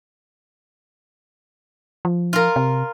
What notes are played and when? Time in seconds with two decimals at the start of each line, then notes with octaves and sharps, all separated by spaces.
2.05 F3
2.33 F4 A#4
2.56 C3